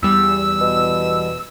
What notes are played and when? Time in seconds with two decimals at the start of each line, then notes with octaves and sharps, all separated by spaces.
0.02 E2 G3 E6
0.61 B2